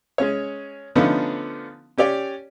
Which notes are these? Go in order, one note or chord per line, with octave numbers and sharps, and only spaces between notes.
G#3 C#4 C#5
D3 F3 A3 B3 C#4 D#4
C#4 G4 C#5 D5